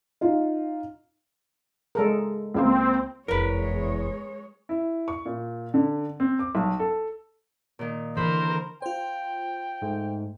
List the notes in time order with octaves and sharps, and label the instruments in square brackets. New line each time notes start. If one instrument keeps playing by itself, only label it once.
[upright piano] D#4 F4
[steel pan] G#3 A4 A#4
[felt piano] C#2 A#3 C5 [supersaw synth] C4
[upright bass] F1 B3 [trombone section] E2 [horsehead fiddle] G#3 C#5 [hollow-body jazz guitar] A#4 B4
[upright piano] E4
C#6
A#2
D3
C4
D6
B1
A4
[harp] A#2 D#3
[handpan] D3 E3 [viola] A#4 [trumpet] C5 [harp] B5
[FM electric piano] F4 C5 [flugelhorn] G5
[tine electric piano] G#2 A3